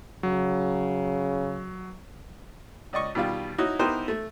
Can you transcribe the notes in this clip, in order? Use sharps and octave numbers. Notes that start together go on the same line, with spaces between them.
C#3 F#3
C#2 D5 D#5 C#6
B2 D#3 G3 F4
D#4 E4 F#4 C#5
B3 D#4 E4 G4 A#4 C5
A3